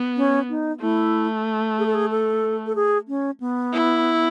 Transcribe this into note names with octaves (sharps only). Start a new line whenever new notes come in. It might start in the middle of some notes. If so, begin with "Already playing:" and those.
Already playing: B3
C#4
D#4
A3 E4
G#4
A4
G#4
A4
A4
G#4
C#4
B3
E4